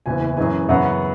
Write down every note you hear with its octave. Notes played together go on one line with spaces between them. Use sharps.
F#1 E2 E3 G#5
F#2 C#3 E3 G#5
F#2 C#3 E3 B3 F#5
F#5